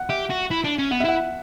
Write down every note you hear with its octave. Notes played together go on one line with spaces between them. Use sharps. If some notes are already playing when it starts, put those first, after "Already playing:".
Already playing: F#5
G4 E5
F#4
E4
D4
C#4
B3 F#5
E5
E4 F#5